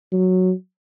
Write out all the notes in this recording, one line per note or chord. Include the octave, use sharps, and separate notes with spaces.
F#3